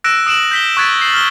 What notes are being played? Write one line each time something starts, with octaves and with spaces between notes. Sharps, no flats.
E6 F#6 A#6 D7 E7
D#6 D7 E7 F#7
G6 B6 G7
C#6 F#6 G#6 A6 B6 D7
C7 F#7
F6 G7